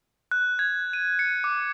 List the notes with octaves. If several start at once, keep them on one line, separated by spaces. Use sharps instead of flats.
F#6
G#6
D#7
C#7
D6